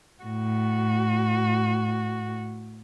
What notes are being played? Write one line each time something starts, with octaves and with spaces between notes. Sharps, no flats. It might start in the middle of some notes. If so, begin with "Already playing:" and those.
A2 F#4